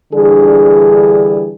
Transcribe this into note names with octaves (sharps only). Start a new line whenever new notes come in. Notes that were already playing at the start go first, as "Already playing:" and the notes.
D3 E3 G3 D4 G#4